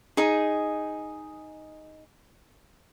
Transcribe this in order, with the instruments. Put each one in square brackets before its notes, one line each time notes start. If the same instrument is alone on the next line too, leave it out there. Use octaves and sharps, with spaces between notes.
[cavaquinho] D#4 G#4